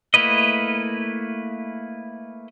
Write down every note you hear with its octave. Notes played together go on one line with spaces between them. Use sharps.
A3 A#3 E4 B4 D#5